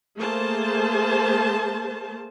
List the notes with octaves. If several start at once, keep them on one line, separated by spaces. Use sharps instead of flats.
A3 A#3 G#4 C5 A5